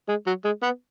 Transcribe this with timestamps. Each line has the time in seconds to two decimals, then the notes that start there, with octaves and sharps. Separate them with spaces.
0.08 G#3
0.26 F#3
0.44 G#3
0.62 B3